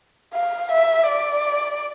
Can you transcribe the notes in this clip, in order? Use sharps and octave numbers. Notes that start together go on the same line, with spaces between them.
F5
E5
D5